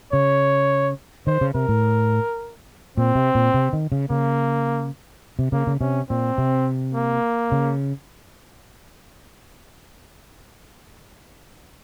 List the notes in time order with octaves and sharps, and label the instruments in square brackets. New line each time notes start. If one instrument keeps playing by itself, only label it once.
[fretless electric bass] C#3 [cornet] C#5
[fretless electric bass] D#3 [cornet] C5
[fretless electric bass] C#3
[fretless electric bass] C3 [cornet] A#4
[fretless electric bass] A2
[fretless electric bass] A#2 [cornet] C4
[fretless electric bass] C3
A#2
C3
D#3
C#3
[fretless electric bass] C#3 [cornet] A#3
[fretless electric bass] C3
[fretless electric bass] C#3 [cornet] A#3
[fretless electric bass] C#3
[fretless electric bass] C3 [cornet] C#4
[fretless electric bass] A#2 [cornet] C4
[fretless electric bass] C3
[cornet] A#3
[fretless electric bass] C#3